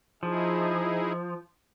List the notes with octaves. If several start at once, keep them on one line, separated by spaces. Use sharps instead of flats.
F3 D#4 E4 G#4